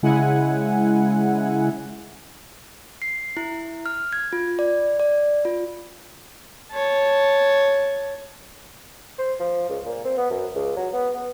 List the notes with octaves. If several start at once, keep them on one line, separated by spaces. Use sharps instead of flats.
C#3 G#3 E4 F#5 G#5
C7
E4
F6
G#6
F4
D5
D5
F4
C#5 A5
C5
F3
C#2
A#2
C4
B3
F#2
C#2
F#3
B3
B3